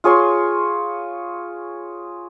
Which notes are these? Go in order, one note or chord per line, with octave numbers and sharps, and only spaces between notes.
F4 G#4 C#5 C6